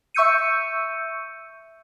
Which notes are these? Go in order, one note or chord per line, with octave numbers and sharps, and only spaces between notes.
E5 C#6 E6 G6 C#7 D#7